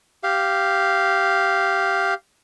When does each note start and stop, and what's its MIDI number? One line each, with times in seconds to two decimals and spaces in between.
0.23 2.14 67
0.23 2.14 77